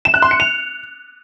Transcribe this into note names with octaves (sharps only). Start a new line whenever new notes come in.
E7
F#6
C6
C#7
F7